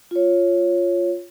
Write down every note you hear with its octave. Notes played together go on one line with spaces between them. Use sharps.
F4 C#5